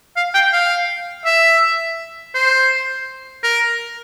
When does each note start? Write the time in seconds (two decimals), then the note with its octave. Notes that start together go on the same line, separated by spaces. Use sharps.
0.16 F5
0.34 G5
0.53 F5
1.25 E5
2.34 C5
3.43 A#4